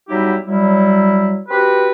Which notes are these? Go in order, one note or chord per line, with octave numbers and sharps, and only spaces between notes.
F#3 G3 B3 D#4 E4 G4
F#3 G3 E4
C4 F#4 G4 B4